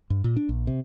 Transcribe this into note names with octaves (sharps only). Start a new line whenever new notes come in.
G2
A#2
D4
A#1
C3